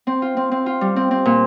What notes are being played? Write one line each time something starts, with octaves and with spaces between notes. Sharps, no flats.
C4
F4
C4
C4
F4
G3
C4
C4
A#2